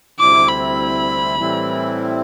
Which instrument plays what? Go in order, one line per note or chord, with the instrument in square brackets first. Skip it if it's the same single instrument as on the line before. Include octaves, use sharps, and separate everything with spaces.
[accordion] D2 C3 G3 C4 E4 [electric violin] D6
[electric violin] B5
[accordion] A2 E3 G3 C4 E4